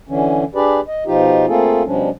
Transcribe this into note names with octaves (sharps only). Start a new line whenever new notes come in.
D3 E3 C#4
D4 G4 G#4 B4 D5
D#5
B2 F3 D#4 F4 G4
A3 A#3 C4 F4 G#4 A4
B2 F3 G3 C#4 D4